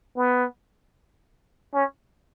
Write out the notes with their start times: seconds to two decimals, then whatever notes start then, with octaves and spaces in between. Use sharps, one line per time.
0.16 B3
1.74 C#4